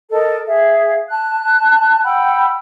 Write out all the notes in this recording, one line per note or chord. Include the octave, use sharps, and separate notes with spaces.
A4 A#4 D#5
G#4 E5 F5
A5 F#6
F#5 G5 B5 E6